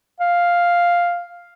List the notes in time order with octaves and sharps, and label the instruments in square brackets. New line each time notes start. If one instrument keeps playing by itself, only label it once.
[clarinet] F5